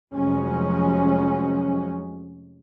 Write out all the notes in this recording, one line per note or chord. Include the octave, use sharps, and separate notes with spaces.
F1 F3 F#3 G#3 C#4